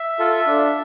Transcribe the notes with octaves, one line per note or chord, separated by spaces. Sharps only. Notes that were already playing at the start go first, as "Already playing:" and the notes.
Already playing: E5
F4 A4
D4